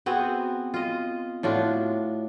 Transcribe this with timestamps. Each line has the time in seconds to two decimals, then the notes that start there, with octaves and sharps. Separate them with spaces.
0.06 B3 C4 F#4 G#4
0.74 F4 D#5
1.43 A2 D4 F4 F#4